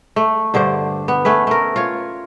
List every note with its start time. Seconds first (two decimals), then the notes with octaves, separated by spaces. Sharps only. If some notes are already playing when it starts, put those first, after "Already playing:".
0.16 A3
0.54 G2 D3 D4 C5
1.08 B3
1.25 A3 C#4 B4
1.47 A3 A#4
1.76 F4 C#5